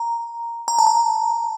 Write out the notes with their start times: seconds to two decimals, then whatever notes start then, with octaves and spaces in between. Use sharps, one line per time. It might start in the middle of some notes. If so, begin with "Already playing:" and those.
Already playing: A#5
0.68 A#5
0.79 A5
0.87 A#5